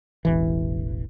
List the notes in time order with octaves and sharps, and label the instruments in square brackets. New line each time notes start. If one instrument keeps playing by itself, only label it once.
[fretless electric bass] E1 A1 E3